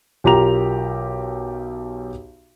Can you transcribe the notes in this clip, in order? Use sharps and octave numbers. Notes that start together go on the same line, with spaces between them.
B1 F4 G4 A#4 A#5 F7